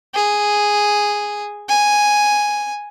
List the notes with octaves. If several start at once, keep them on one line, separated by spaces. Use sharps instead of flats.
G#4
G#5